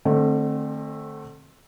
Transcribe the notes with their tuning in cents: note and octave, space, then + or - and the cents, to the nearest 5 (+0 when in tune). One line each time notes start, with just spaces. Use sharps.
D3 +40 A3 +0 C4 +25